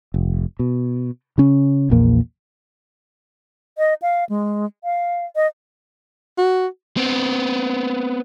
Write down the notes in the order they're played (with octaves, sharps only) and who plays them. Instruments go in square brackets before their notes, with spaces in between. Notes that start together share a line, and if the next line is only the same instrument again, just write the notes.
[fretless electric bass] F1
B2
C#3 C#4
A#1 E2 A#2 A#3
[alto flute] D#5
F5
G#3
F5
D#5
[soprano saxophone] F#4
[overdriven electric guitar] B3 C4